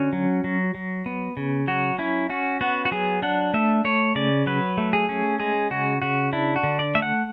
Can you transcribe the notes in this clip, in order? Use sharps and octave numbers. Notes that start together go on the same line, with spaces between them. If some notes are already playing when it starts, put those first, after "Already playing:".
Already playing: D3 C#4 F#4
F#3
F#3
F#3
B3
C#3
F#3 F#4
C#4 E4
C#4 F#4
B3 F#4
F#4
F#3 G#4
D4 F#5
A3 E5
A3 C#5
C#3 D5
F#3 B4
A3
G#4
C#4
G#3 G#4
C#3 F#4
C#3 F#4
D4 E4
F#4
D3
D5
A3 E5
F#5